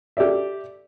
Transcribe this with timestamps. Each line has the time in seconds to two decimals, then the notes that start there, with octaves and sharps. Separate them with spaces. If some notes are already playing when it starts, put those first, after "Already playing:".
0.17 G4 A4 D5 E5